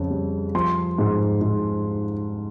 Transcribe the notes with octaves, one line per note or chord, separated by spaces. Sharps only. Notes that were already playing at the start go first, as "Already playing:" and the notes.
Already playing: F2 C#3 C#4
G3
F3 C6
G#2
G#2